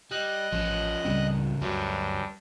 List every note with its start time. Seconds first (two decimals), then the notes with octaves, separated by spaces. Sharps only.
0.11 G3 D#5 F#6
0.53 A1 F3 C#4
1.05 C#2 A2 C#3 G3 C4
1.61 D2 G2 F#3 C#4